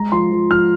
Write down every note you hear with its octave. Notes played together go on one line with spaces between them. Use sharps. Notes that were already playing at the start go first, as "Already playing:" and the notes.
Already playing: G#3 A#5
F3 C6
F3
F3 F6